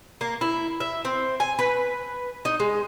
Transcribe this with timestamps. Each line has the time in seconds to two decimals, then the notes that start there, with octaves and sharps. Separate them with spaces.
0.21 A#3
0.41 E4
0.80 E5
1.05 C4
1.40 G#5
1.59 B4
2.45 D#4
2.60 G#3